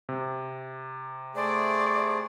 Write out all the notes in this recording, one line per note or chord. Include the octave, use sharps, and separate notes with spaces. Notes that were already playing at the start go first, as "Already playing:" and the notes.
C3
A3 G#4 C5 D5